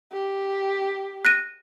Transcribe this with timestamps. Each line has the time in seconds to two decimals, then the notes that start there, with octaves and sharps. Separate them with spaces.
0.13 G4
1.25 F#6 A#6 D#7